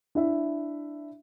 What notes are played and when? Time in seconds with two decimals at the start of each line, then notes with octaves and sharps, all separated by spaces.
0.15 D4 E4 E5